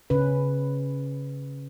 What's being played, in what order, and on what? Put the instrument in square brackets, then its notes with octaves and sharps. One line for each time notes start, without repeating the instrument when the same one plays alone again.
[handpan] C#3 C#4 B4